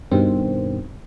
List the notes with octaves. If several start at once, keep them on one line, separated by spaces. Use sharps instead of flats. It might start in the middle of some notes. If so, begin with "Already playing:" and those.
G2 B2 D#3 C4